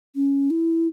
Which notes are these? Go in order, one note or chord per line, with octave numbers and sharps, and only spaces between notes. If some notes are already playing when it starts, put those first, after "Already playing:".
C#4
E4